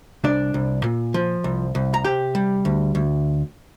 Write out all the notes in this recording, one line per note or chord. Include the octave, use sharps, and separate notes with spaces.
C2 D4 D5
C2
A#2
F3
C2
C2
A#5
C3 G4 G5
G3
D2
D2